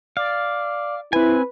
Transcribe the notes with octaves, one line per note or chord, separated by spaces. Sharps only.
D5 F5
C4 E4 B4 G#5